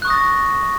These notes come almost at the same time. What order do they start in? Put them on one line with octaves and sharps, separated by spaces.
F#6 C#6 D#6 A#6 A6